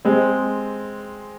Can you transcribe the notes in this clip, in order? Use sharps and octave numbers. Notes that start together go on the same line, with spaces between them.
G#3 C4